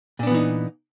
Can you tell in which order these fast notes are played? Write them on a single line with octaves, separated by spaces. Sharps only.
A#2 D4 B3 E3 D#4